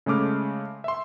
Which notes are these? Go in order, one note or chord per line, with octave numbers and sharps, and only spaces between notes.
C#3 G#3 A3 D6 F6
E5 C6